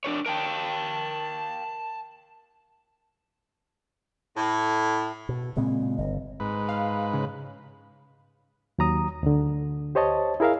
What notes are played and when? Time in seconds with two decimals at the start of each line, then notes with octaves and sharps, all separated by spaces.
0.04 D4 A#4 C#5
0.26 A#4 F5 G5 A5
4.37 A2
5.29 B2
5.57 A#2 C#3 G#3 C4
5.98 G1 D#5
6.40 G#2 B4
6.69 F5
7.14 C#3
8.79 D#2 F#3 A#5 D#6
9.23 D2 D3
9.95 G4 C5 C#5 D#5 A5
10.40 E4 G#4 A#4 E5 F5